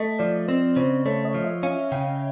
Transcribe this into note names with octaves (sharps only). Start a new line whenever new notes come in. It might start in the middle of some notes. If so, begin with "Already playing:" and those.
Already playing: A3 D#5
F3 D5
C4 C5
C#3 C5
A3 C#5
D#5
F3
E5
C#4 F5
C#3 G5